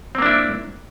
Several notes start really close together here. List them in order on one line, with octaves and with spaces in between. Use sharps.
C4 A#3 D4 E4